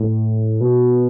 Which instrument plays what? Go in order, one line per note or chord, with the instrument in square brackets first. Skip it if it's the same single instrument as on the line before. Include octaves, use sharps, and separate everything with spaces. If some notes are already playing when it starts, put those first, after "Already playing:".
Already playing: [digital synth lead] A2
B2